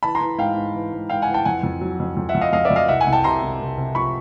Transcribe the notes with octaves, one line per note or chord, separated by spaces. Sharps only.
E3 A5 B5
A#5 C6
E3
G#2 F5 G5
G#2
E3
G#2
G#2 F5 G5
F#5 G#5
E3
G5 A5
F2 F#5 G#5
F2
F#3
F2
F2
E5 F#5
F2
D#5 F5
F2 D#5 F5
D5 E5
F2
D#5 F5
C2 E5 F#5
F#5 G#5
C2
G5 A5
C3 A#5 C6
C2
C2
C3
F3 B5 C#6